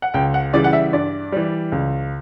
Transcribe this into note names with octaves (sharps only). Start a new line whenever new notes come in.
F#5
C#2 G5
F#5
C#3 E3 G3 D5
F#5
E5
G2 D5
E3 G3
C#2